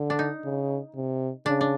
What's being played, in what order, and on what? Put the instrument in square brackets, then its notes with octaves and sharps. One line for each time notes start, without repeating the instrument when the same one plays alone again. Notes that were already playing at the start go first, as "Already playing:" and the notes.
Already playing: [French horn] D3
[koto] D4
D#4
[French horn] C#3
C3
[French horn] C#3 [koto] D4
[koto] D4